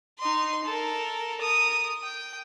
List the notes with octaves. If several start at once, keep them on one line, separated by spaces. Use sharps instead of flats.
D#4 C6
A4 A#4
A#4 D#6
G5